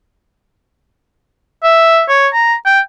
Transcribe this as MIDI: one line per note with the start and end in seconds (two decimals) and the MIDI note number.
1.63 2.02 76
2.09 2.28 73
2.34 2.54 82
2.66 2.80 79